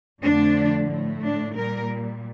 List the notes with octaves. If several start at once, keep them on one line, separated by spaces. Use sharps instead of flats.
F2 D3 F3 A3 D4
A2 A3
D4
A#2 G3 A#4